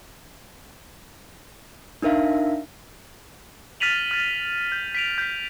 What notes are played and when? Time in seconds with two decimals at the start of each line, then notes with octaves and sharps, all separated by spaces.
2.02 D4 D#4 A#4 E5 F5
3.80 F6 A6 B6 D#7 F7 F#7
4.11 F6 A6
4.72 G6
4.95 B6 D7 F7
5.18 G6 B6